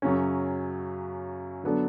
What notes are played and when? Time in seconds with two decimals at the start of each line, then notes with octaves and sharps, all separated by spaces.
0.02 F#2 C#3 F#3 C#4
1.63 D3 F#3 B3 D4 A4